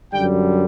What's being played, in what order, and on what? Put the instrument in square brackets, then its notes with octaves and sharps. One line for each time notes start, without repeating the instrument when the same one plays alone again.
[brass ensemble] F#2 D3 G3 G5